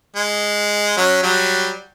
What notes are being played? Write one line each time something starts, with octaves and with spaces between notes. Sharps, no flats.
G#3
F#3 C#4
F#3 G3